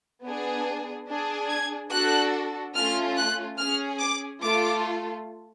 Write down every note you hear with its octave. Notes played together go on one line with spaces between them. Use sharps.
B3 D4 G#4
D4 G#4
G#6
D4 F#4 A4 F#6
A3 C#4 F4 F6
F#6
C#4 G#4 F6
D6
A3 F4 A4 D6